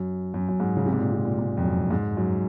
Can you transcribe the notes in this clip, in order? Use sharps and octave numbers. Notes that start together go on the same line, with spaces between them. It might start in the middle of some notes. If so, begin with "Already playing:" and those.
Already playing: F#2
F#2
F#2
G#2
C#3
C3
G#2
A#2
C3
A#2
G#2
F2
F#2
G#2
F#2